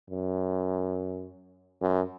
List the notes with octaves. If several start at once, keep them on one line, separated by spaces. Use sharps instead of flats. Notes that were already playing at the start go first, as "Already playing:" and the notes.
F#2
F#2